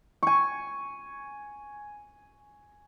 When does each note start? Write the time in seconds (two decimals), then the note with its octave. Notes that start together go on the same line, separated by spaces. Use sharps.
0.23 G#5 C#6